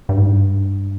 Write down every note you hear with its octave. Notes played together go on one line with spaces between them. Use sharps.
G2
G#2
G2